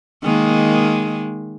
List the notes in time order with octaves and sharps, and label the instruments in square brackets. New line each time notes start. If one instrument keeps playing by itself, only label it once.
[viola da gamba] D#3 G#3 A#3